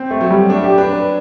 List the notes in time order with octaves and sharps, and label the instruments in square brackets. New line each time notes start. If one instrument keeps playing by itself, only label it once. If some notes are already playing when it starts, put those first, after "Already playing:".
Already playing: [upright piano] C4
[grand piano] A3
[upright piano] F#3
[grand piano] G3
[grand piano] A3 [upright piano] D4
[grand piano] G4
[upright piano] D4 [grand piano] B4
[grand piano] B4